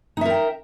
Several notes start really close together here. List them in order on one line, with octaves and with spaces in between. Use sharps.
D#4 E5 A#4 G5